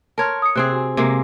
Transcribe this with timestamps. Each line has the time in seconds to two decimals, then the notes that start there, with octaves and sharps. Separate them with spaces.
0.18 A#4 C#5 A5 C6 F6
0.42 D#6 C#7
0.56 C3 C4 G#4 F#6
0.73 F#4 G#5
0.97 C3 G#3 A#3